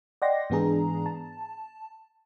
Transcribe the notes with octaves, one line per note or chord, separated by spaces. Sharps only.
D5 D#5 F#5 G5 C6 A#6
G#2 E3 B3 D4 G#4 A#5
A5